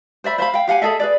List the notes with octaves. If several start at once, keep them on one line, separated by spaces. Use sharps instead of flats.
C5 D5 E5 B5
C5 E5 F5 B5
F5 G5
G4 F5 F#5 G#5
G#4 A4 D#5 E5
G#4 B4 D5